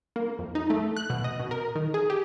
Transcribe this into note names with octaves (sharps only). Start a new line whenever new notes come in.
A#3
F2
D#4
A3
F#6
B2
D#5
B2
A#4
D#3
G#4
G4